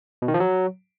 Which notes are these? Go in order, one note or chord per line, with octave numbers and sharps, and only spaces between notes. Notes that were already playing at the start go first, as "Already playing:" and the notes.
B2
D#3
F3
F#3